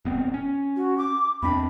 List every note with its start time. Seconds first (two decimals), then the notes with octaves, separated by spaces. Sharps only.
0.05 D#1 B3 C4
0.34 C#4
0.76 F#4
0.98 D6
1.43 E2 C4 D4 B5